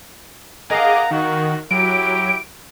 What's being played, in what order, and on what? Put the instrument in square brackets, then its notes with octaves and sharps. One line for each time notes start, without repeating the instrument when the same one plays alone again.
[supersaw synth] G#4 D#5 D6 [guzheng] A#4 F5 [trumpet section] F#5 A#5
[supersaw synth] D#3 [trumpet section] F#4
[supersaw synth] F#3 [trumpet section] E4 G4 [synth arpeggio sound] D7